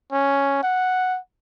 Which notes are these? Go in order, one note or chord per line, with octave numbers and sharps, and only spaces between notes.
C#4
F#5